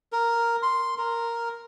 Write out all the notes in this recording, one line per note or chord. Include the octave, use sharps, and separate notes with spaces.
A#4
C6
A#4